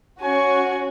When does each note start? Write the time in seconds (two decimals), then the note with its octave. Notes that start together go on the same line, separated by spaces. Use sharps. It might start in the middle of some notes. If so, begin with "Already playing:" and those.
0.21 C#4 F#4 G#5 C#6